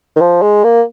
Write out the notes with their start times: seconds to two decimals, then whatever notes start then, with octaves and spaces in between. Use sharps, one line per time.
0.16 D#3
0.21 F3
0.42 G#3
0.64 A#3